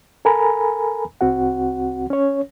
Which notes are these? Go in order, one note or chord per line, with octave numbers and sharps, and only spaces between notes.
A4 A#4 G#5 A#5 B5
C2 C4 F#4 F#5
C#4 C#5